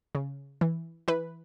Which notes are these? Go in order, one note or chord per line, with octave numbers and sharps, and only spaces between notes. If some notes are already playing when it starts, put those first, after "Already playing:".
C#3
E3
E3 B4